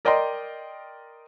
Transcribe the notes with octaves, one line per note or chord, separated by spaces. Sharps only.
A#4 D5 D#5 G5 A#5 C6